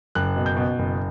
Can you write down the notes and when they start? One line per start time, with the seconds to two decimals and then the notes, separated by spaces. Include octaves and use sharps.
0.15 F#1 F#6
0.36 B2
0.46 G6
0.57 B2
0.79 F#1